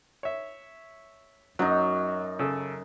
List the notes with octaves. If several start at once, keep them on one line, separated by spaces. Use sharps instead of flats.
C#5 E5
F#2 F#3 D#4
C#3 A4